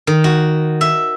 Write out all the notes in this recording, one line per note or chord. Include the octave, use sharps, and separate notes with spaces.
D#3
F#4
E5